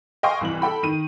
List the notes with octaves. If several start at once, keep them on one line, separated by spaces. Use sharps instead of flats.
D#5 F5 G5 G#5 C6 C#6
C2 E3 F#7
A4 G5 B5
D#3 D#7